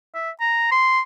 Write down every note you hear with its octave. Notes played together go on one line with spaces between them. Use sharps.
E5
A#5
C6